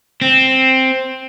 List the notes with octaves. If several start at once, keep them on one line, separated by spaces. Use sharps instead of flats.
C4